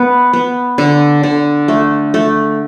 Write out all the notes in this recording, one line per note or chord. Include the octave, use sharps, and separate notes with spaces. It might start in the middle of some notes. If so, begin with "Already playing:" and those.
Already playing: B3
B3
D3
D3
A3
A3